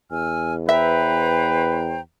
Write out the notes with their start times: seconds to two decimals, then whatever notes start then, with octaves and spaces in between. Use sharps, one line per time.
0.12 E2 G#5 E6 F6
0.69 B4 C5 E5 G5 A#5